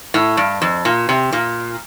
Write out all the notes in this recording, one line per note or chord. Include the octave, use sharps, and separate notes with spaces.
A2
G2
F2
A#2
C3
A#2